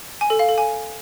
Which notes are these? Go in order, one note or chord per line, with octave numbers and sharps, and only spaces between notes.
G#5
A4
F5
A4
G#5